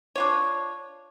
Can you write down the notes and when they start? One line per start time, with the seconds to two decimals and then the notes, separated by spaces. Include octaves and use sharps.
0.16 D4 F4 C#5